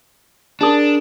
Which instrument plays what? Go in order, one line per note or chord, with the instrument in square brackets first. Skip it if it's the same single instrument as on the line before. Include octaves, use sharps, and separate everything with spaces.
[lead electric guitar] D4 [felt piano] G#4 A#4 D#6